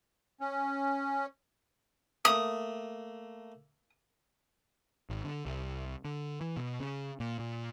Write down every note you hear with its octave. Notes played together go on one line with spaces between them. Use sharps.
C#4
A3 A#3 D#6
G#1
D3
C2
D3
E3
B2
C#3
A#2
A#2